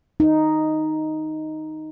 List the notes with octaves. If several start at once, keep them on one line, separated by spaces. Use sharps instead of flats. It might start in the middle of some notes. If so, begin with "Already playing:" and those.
D#4